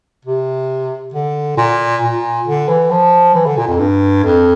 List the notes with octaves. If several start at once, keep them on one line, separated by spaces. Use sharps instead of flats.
C3
D3
A#2
A#2
D3
E3
F3
E3
D3
A#2
F2
G2
F2